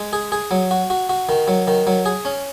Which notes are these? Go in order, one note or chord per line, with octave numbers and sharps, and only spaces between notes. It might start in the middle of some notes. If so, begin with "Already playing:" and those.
Already playing: G#3
G#4
G#4
F#3
F#4
F#4
F#4
D#3
F#3
D#3
F#3
G#4
C#4